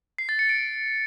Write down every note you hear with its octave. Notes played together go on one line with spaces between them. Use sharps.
C7
A6
C#7
D7